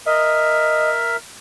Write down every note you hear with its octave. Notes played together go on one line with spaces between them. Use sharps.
A#4 D#5 E5